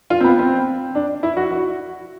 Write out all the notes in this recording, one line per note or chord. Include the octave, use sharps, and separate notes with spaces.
F4
C4
B3
C4
D4
E4
F#4
F#4